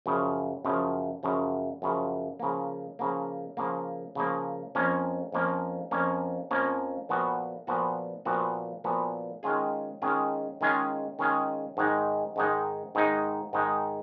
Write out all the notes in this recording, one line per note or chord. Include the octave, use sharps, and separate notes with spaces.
F#2 C#3 F3
F#2 C#3 F3
F#2 C#3 F3
F#2 C#3 F3
C#3 F3 A#3
C#3 F3 A#3
C#3 F3 A#3
C#3 F3 A#3
F2 F3 A#3 C#4
F2 F3 A#3 C#4
F2 F3 A#3 C#4
F2 F3 A#3 C#4
A#2 F3 B3 F#4
A#2 F3 B3 F#4
A#2 F3 B3 F#4
A#2 F3 B3 F#4
D#3 G#3 C#4 F4 G#4
D#3 G#3 C#4 F4 G#4
D#3 G#3 C#4 F4 G#4
D#3 G#3 C#4 F4 G#4
G#2 D#3 G#3 D#4
G#2 D#3 G#3 D#4
G#2 D#3 G#3 D#4
G#2 D#3 G#3 D#4